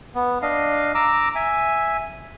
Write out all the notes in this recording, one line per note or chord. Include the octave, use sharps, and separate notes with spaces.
B3
D4 D#5 F5
A#5 D6 E6
E5 G#5